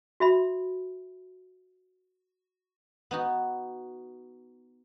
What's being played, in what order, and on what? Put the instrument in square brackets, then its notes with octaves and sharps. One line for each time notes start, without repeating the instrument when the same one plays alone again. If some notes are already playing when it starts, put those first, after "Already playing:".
[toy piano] F#4 E5 B5
[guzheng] B3 D#4 F#4